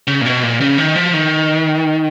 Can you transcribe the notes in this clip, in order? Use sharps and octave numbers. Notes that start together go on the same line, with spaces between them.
C#3
A#2
B2
A#2
C#3
D#3
F3
D#3